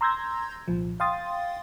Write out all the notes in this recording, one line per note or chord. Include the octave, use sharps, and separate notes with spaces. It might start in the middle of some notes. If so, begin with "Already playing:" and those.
A#5 C6 E6 G6 G#6 A#6
C2 A#2 F3
F5 G5 C6 D#6 A6